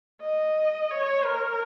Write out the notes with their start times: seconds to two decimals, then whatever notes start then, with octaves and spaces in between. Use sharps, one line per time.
0.22 D#5
0.91 C#5
1.25 A#4